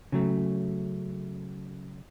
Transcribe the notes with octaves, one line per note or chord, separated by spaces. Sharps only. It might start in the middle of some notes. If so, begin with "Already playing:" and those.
C#3 F#3 A3